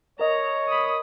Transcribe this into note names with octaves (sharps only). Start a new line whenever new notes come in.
A#4 C#5 D#5 A#5
B5 D#6